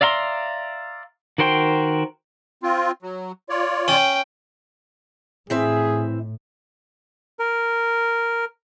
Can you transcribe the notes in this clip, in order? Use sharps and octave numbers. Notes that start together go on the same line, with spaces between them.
D5 E5 F5 A#5 C6
D#3 F#4 A#4 C5 G5
C4 F4
F#3
F4 C#5 D5
C#4 G5
A2 E3 C4 G#4 E5
A#4